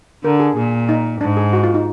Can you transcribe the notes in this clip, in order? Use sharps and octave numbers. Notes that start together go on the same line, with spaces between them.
D3 A#4
G#4
A#2 G#4
D#4
G#2 D4
G#4
F#4
F4
D#4